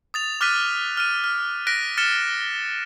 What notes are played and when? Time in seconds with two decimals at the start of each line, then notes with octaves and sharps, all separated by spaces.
0.14 D#6 A6 F7
0.41 D6 F6 F#6 A6 B6 D#7
0.97 F6 D#7
1.24 F6
1.67 F#6 A#6 B6 D7
1.97 F6 A6 C#7 E7 G7